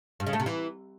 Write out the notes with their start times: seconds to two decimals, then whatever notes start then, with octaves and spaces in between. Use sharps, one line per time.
0.20 G2
0.27 C#3
0.33 A3
0.40 C3
0.46 E3